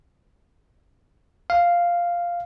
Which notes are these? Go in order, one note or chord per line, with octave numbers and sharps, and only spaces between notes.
F5